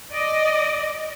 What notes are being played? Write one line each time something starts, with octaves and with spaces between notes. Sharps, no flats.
D5 D#5